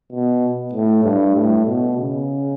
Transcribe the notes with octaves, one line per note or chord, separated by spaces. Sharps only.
B2
A2
G2
A2
B2
C#3